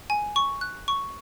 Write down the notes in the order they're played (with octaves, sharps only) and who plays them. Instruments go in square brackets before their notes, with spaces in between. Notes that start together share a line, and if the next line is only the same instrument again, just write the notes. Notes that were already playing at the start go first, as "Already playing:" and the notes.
[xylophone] G#5
C#6
F#6
C#6